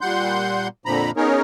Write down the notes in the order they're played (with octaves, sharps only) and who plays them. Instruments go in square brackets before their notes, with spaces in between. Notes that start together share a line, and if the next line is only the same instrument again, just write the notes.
[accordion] A#2 G3 F#5 C6 G6
F2 A#2 D3 F3 A#5 B5
B3 C#4 D#4 G#4 A#4 C#5